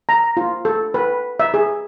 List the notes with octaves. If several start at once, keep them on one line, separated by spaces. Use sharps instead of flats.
A#5
F4
A4
B4
E5
G#4